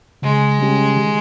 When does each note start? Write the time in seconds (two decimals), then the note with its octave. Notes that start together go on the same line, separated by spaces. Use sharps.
0.22 C#3 G#3
0.59 G3 C#4 G4
0.96 D#3